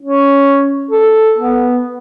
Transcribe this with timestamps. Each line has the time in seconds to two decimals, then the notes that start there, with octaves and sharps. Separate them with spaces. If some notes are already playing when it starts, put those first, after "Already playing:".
0.01 C#4
0.91 A4
1.38 B3